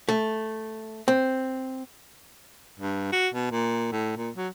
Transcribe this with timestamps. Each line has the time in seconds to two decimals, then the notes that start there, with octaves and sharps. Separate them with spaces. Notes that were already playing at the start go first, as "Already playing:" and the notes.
0.09 A3
1.08 C4
2.79 G2
3.12 F#4
3.34 B2
3.51 A#2
3.92 A2
4.17 A#2
4.37 F#3